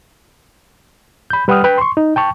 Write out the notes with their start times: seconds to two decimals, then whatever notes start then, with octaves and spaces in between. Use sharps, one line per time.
1.30 B5 G6
1.48 G3 B4 F#5 G5 D#6 F6
1.64 B4 G5 B5
1.78 C6 C#6
1.97 D#4
2.16 G5 A5 C#6